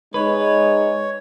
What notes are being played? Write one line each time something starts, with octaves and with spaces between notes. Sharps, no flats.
G#3 D#4 B4 C#5